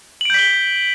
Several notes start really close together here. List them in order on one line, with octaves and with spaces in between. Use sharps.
F#7 D7 G6 B6 G7